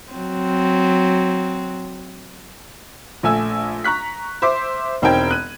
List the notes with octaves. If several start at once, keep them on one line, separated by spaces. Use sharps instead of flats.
F#3 C4
A#1 A3 G#5 E6
A#5 C#6 F#6 B6
C5 E5 C6 D6
E1 C4 D#4 A#4 G5 G#6
F#6 D#7